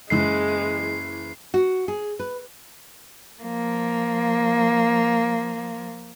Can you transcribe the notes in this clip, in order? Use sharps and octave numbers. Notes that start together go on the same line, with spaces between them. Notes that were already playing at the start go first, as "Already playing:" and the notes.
F#1 E3 G#3 C7
F#4
G#4
B4
F3 A#3